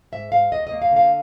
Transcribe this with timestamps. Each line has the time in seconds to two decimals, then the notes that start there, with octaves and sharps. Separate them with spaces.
0.12 G#2 E5
0.32 G#2 F5
0.52 D#2 D#5
0.67 A#3 D#5
0.82 F5
0.91 D3
0.96 F5